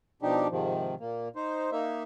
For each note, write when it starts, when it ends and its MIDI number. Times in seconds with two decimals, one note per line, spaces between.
0.22 0.47 47
0.22 0.47 53
0.22 0.47 62
0.22 0.47 63
0.22 0.47 67
0.50 0.95 44
0.50 0.95 48
0.50 0.95 51
0.50 0.95 53
1.00 1.28 46
1.00 1.28 58
1.36 1.70 63
1.36 1.70 72
1.72 2.03 58
1.72 2.03 63
1.72 2.03 76